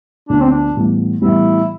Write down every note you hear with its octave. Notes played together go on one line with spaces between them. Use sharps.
D2 D3 F3 B3 D4
C4
D4
A2 E3 G3 B3
A2 E3 G3 B3 E4